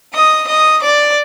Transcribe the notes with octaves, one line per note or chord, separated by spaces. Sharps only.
D#5 D#6
D#5 D#6
D5 D6